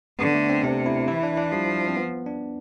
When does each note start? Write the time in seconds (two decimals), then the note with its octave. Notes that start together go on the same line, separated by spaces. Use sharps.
0.19 D3 B3
0.34 A3
0.49 C4
0.63 C3 D4
0.86 E4
1.08 E3 E4
1.23 D4
1.37 D4
1.52 F3 G3
1.88 C4
1.97 B3
2.26 D4